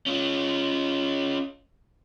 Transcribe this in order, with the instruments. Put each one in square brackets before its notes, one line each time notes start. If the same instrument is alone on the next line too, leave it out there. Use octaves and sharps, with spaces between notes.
[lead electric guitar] C#4 F4